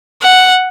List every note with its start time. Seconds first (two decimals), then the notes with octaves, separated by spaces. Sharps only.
0.22 F#5